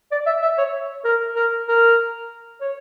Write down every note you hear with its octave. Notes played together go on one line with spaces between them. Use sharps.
D5
E5
E5
C#5
A#4
A#4
A#4
C#5